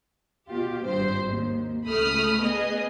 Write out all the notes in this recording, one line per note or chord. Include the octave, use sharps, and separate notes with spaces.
B2 F4 G4
G#1 G2 C5
D#2
C#2 A3 B5 D#6 F6
B3 G#4 D#5